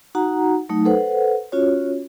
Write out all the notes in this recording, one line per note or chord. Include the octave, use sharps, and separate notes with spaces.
D#4 F#4 F#5 A#5
F#3 A3 D#4
A4 B4 C5 F#5
C#4 F4 F#4 C#5